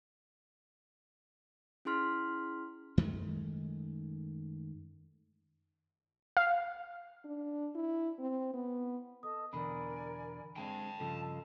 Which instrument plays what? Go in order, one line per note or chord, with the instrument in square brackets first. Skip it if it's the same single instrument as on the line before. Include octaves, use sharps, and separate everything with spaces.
[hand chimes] C#4 E4 G#4 C6 F6 B6
[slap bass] F#2 D#3 G#3 A3
[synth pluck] F5
[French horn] D4
E4
C4
B3
[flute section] A4 D#5 [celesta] D#6
[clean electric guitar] E2 B2 D3 [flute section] A#4 D5 G#5 [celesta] B5
[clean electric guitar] D3 G#3 C4 [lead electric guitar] G5 A5
[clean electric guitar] G2 C#3 F3 [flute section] F4 A4 D#5